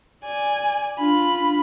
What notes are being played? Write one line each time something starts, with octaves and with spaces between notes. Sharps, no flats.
D5 G#5
D4 F4 B5